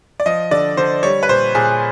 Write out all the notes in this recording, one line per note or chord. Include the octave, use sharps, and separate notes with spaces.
D5
F3 D#5
D3 D5
D3 C5
G3 C#5
B4
A#2 C5
A#2 G#4